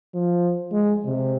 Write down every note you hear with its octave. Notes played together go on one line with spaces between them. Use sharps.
F3
G#3
C3